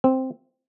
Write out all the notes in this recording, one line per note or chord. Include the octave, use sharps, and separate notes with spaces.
C4